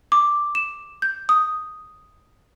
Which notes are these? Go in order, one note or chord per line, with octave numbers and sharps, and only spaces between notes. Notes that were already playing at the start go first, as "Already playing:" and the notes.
D6
E7
G6
D#6